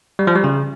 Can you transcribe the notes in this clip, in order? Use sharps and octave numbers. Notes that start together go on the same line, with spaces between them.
G3
F3
G3
C#3